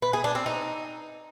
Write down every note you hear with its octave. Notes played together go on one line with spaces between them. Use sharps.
B4
G#4
D4
C4
D#4